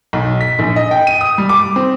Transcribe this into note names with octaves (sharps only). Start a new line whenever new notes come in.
B1
B6
A#1
D#5
G5
D#7
D#6
G3
D6
C4